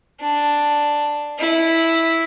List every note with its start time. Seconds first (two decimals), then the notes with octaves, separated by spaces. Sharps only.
0.21 D4
1.39 E4